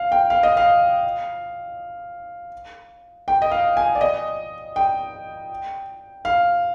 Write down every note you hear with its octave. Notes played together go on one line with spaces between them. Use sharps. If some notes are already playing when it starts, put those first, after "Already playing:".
Already playing: F5
G5
F5
D#5
F5
G5
D#5
F5
G#5
D5
D#5
G5
F5